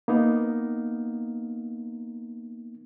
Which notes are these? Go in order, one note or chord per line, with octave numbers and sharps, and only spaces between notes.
A#3 B3 D#4